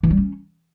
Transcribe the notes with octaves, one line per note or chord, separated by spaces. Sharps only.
E3
G3
C#4